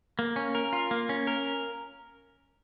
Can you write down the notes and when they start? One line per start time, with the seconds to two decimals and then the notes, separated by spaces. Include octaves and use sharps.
0.19 A#3
0.36 C#4
0.55 A#4
0.73 F4
0.91 A#3
1.09 C#4
1.27 A#4